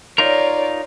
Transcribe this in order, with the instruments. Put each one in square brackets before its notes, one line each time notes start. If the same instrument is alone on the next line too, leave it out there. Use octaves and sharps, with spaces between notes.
[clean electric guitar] D#4 F4 A#4 [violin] C#5 D5